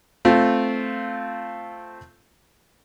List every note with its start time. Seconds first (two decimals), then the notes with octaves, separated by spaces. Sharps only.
0.25 A3 C4 F4